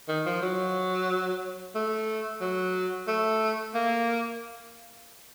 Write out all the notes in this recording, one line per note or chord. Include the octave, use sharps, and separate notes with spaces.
D#3
F3
F#3
A3
F#3
A3
A#3